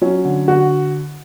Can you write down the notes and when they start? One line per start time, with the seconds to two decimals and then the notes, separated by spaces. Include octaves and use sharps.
0.02 F#3 C#4
0.25 D3
0.48 D3 F#4